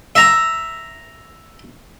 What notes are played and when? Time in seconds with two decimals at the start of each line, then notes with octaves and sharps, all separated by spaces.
0.15 E5 A#5